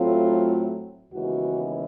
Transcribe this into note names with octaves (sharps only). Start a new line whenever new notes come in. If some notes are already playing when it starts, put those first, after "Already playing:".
Already playing: A2 F#3 A3 C4 F4
D#2 C#3 E3 G#3 B3 F#4